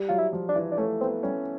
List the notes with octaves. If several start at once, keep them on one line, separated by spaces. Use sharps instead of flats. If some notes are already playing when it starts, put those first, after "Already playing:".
Already playing: G3
F#3 F4
E4
F3
D4
E3
D4
A3 C#4
B3 C4
G3 C#4